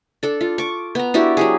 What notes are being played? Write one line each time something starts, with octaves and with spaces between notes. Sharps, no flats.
D4 A4
F4
C#6 D6
B3 A#5
D4 E4 F#4 G4
F#3 G4 G#4